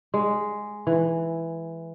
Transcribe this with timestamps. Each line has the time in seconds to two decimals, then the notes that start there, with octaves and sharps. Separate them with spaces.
0.14 G#3
0.87 E3